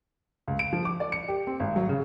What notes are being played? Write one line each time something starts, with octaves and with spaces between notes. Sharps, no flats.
C#2
D7
F3
D6
D5
C#7
G4
C4
G#1
F#3
C#3